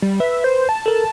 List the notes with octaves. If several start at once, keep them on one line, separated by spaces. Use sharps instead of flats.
G3
B4 E5
C5
A5
A4 A#4